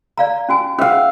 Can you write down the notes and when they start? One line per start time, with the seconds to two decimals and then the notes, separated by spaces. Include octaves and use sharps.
0.18 D5 F5 A#5
0.49 C#4 F#4 G#5
0.78 C#4 C5 E5 F5 G5